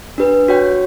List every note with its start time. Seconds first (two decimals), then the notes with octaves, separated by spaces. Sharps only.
0.18 D4 G4 B4
0.48 F#4 C#5 G5